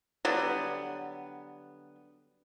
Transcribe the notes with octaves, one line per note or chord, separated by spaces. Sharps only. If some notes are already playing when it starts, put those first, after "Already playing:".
D3 F#3 G3 B3